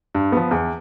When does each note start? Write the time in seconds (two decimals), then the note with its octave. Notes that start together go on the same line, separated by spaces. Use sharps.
0.15 G2
0.32 F3 B3
0.51 E2